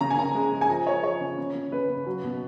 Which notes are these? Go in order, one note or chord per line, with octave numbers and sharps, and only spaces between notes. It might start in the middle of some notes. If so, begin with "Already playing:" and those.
C#3 A#5
G#5
C#3 A#5
G#3
G#3
G#5
F3 A#5
F3 C#5
F3 C#5
C#3
C#3
C#3
C#3 B4
C#3
F#3
B2